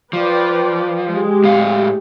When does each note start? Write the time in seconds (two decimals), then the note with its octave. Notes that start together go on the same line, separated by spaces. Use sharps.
0.13 F3 B4 D5 G5
1.09 G#3 G4
1.44 A2 F5